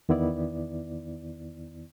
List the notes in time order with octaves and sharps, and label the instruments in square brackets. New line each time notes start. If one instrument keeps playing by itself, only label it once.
[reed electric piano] E2 D#3 B3 E4 D5